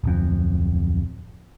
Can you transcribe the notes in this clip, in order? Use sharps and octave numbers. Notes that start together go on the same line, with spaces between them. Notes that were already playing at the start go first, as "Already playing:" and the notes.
D1 F2